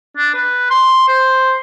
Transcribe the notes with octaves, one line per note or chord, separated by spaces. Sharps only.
D4
B4
C6
C5